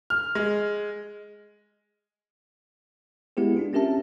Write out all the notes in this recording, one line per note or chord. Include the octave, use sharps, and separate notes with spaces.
F6
G#3
G#3 B3 E4 G4 G#4
D4 F4
C4 C#4 G4 A#4 E5 A5